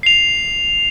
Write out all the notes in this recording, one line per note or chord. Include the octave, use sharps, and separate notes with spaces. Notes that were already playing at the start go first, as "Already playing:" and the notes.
C7 F7